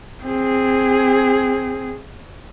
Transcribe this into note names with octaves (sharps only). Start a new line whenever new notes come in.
C4 G#4